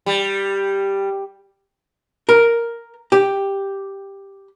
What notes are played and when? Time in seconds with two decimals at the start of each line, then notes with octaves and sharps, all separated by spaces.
0.06 G3
2.29 A#4
3.12 G4